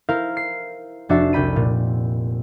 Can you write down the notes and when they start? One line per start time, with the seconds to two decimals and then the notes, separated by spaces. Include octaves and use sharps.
0.09 E4 A#4 C5 F5
0.37 C7
1.09 F1 D4 F#4 E5 A5 C7
1.33 C2 G5 B5 D#7
1.56 A#2